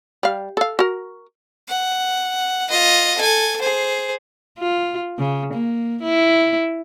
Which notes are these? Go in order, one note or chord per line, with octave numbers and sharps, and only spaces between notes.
G3 F5
A4 F5
F#4 A#4
F#5
F4 D#5
A4 G#5
G#4 C5
F4
C#3
A#3
E4